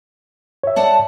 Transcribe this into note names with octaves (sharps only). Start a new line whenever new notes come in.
C#5 E5
D5 F#5 A5